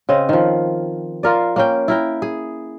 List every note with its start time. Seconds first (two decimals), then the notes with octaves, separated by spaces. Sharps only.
0.09 C#3 C4 D#5
0.29 D#3 F3
1.23 F4 A#4 D5
1.56 A#3 C#4 G5
1.88 E4 A#4 G5
2.22 G#4